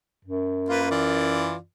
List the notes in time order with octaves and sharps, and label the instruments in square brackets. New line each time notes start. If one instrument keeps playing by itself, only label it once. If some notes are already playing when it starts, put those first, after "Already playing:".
[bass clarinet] F#2
[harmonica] A#3 F4 B4
E3 F4 D5